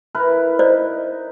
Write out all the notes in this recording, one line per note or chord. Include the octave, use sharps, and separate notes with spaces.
E4 A#4 B4
D#4 C5 D5 D#5